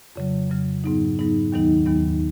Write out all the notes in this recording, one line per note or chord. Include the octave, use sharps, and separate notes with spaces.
F2 C#3 F#3
F2 C#3 F#3
G#2 F#3 B3 D#4
G#2 F#3 B3 D#4
D#2 D#3 F#3 B3 D#4
D#2 D#3 F#3 B3 D#4